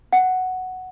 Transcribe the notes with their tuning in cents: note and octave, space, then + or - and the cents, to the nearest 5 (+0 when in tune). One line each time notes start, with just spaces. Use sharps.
F#5 +5